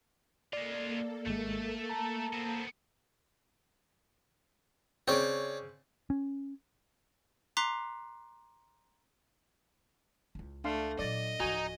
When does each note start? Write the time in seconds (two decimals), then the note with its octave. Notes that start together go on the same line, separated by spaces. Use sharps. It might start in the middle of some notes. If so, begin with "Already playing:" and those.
0.53 G#3 A#3 F4 A4 D5
1.27 G#1 G#3 A3
1.89 A5 A#5
2.33 B3 C4
5.08 C#3 C4 C#5 D5 G5
6.10 C#4
7.57 A#5 C6 D6 F#6 B6 C7
10.35 C#2 E4
10.64 A3 D4 F5 C6
10.99 A#2 F#3 D5 D#5
11.40 D1 F3 D#4 F#4 G#5